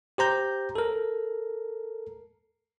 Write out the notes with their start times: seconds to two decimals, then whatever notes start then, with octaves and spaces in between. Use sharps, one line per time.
0.18 G4 C5 A#5 G6
0.75 A4 A#4